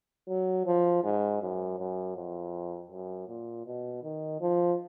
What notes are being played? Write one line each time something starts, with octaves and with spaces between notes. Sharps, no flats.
F#3
F3
G#2
F#2
F#2
F2
F#2
A#2
B2
D#3
F3